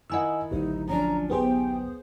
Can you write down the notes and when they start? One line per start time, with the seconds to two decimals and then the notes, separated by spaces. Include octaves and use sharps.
0.10 D#3 E4 D#5 F#5 G#5 E6
0.51 A1 D2 F#3 D#4
0.88 F3 C#4 D4 A#5
1.30 B3 D#4 G4 G#4 C5 G5